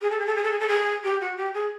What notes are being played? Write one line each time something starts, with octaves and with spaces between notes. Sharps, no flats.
G#4
A4
G#4
A4
G#4
A4
G#4
A4
G#4
G4
F#4
G4
G#4